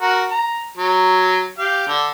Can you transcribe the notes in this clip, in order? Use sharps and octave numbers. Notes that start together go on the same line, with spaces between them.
F#4 A#4
A#5
F#3
G4 F5
D3